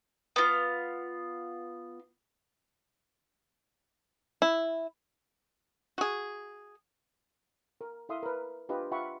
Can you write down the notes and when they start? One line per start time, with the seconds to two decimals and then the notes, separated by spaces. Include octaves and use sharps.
0.36 B3 F4
4.42 E4
5.98 F#4 G#4
7.81 A#4
8.09 E4 A4 E5 F5 C6 D#6
8.23 A#4 B4
8.69 D4 F4 G4 B4 D#5 F5
8.91 F4 E5 F#5 G5 B5 C#6